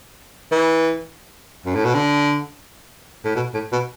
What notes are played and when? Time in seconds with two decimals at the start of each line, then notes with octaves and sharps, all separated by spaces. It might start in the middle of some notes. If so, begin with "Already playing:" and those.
0.51 E3
1.65 F#2
1.75 A2
1.85 B2
1.94 D3
3.24 A2
3.36 B2
3.54 A2
3.72 B2